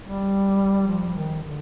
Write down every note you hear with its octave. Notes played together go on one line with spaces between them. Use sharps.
G3
F3
D#3
D3